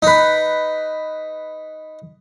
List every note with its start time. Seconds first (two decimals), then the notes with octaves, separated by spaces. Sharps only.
0.02 D#4 B4